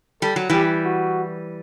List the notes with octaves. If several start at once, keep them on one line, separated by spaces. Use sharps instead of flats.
G3 A4
F#3
E3 G3 G4
F#4